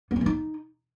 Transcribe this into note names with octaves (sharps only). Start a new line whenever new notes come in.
B3
C#4
E3
D#4